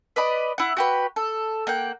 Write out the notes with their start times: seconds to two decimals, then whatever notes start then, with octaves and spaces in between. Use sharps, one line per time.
0.16 B4 D5 D#5 B5
0.58 E4 F#5
0.77 F#4 G4 B4
1.16 A4
1.67 A#3 F#5 G5